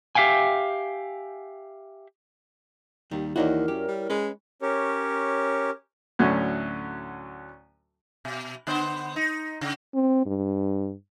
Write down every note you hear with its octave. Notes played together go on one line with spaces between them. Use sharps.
G4 E5 F5 G5 G#5
D#2 D#3 G3
D#2 E3 D#4 E4 F#4 A#4 C#5 D5
F#2 G4
G3
G#3 C#4 B4
C#4 G4 A#4 C#5
D2 A2 F#3 C#4
B2
D3 B3 C5
D#4
C#3
C4
G2